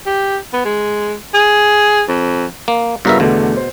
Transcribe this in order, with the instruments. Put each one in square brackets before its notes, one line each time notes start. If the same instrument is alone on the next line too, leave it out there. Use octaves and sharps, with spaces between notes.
[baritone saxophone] G4
B3
G#3
G#4
F2
[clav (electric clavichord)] A#3
[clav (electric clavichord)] G2 A#4 E5 [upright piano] C#3 B3 F4
[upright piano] E2 D3 A3 [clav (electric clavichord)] B2
[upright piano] C5